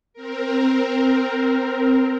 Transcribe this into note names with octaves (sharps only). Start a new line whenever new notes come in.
C4 A#4